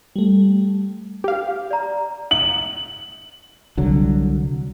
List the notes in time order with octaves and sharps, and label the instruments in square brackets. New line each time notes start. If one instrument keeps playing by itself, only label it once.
[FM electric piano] G3 A3
[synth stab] G4 F5
[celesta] D5 A#5
[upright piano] F#7
[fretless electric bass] C2 D3 F#3